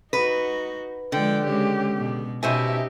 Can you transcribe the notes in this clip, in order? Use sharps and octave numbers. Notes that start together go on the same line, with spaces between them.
D#4 F#4 B4
D3 F3 G#3 D5 G5
C#3 G#3 C#4 G4
B2 B3
B2 C#4 D#4 G4 C5 E5 G#5